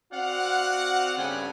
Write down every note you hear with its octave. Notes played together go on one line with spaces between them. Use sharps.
C4 F#4 D5 F5 F#5
G2 C#3 A3 B3 G5 G#5